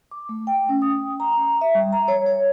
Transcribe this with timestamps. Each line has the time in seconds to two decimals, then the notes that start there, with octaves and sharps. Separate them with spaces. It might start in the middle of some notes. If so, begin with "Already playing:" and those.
0.11 D6
0.29 A3
0.47 G5
0.69 C#4
0.82 D#6
1.20 A#5
1.61 E5
1.75 G3
1.92 A#5
2.08 C#5
2.26 C#5